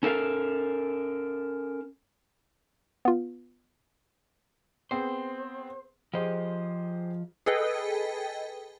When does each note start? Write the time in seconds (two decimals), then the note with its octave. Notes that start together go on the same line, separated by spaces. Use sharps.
0.03 C#4 A4 A#4 F5
3.05 B3 F4
4.91 B3 C4 G#4 C5
6.14 F3 G4 G#4 C5 D#5
7.46 G#4 A4 B4 D#5 G5